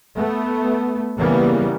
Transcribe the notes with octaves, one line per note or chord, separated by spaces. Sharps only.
A3 B3
C#3 E3 G3 A#3 B3